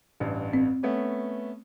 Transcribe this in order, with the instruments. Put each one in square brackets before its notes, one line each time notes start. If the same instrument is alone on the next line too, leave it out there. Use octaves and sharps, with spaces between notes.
[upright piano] A1 G2
[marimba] C4
[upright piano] A3 B3 C#4